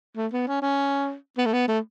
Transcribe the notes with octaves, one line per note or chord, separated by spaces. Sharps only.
A3
B3
C#4
C#4
B3
A3
B3
A3